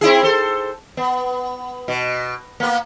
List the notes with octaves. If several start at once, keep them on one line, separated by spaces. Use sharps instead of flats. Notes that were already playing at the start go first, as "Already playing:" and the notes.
C4 E4 G#4
A4 C5
B3
B2
A#3 B3